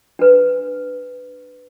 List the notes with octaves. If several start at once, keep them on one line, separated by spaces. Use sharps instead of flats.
D4 B4